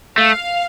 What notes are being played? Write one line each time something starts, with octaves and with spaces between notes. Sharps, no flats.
A3 F5